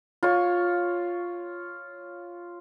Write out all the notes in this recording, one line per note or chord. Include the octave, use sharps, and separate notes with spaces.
F4 C#5